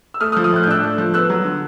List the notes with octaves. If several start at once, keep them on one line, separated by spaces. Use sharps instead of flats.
E6
A3 D#6 F6
D#6 F6
F3
D#6 F6
A2 F#6
G6
D4 E6 F#6
A3
F3
B3 E6 F#6
F#3
D3